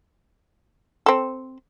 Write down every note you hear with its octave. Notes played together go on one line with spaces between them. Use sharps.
C4 A4